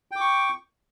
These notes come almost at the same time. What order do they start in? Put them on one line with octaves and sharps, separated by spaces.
G5 D6 C#6